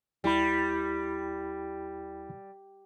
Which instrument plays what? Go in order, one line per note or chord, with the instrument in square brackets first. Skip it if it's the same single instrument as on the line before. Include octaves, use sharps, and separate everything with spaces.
[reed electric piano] D#2 E4 B5 [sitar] G3